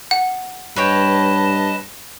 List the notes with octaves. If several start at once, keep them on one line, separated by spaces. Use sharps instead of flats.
F#5
G2 B4 C#5 D#5 G5 A5